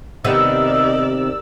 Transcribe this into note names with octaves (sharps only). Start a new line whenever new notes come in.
C3 D#3 B3 D#4 G4 A#4 D5 E6